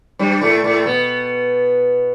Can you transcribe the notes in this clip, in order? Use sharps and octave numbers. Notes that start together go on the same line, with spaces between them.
G2 G3
A2 A3
A2 A3
B2 B3